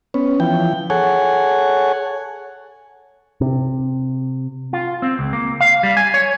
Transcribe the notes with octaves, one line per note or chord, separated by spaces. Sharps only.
B3 C#4
E3 F3 G5
G#4 A4 C#5 F#5 G#5
C3
F4
C4
C#2
A#3
F5
G3
G#5
C#5